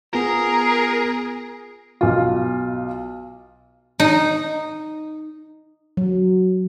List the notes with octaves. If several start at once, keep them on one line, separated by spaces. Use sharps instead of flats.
B3 F4 G#4 A#4
B1 F4
D#4
F#3